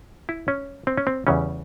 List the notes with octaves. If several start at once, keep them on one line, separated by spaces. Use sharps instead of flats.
E4
C#4
C4
C#4
C4
E2 C#3 E3 G3 C#4